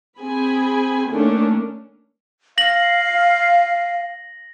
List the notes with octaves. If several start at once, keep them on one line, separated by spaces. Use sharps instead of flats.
C4 G#4 G#5 B5
D#3 A3 A#3 C#4 D4
F5 A#6 F#7